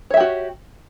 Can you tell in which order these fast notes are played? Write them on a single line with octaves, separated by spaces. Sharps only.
C#5 E5 G4 F#4